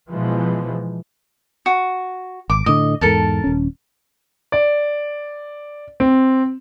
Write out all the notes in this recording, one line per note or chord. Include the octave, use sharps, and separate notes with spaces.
B2 E3 F3 G#3
F#4
G#1 D6
A2 D3 D#5
E2 G#2 A4 A#4 A5
D#1 C#4
D5
C4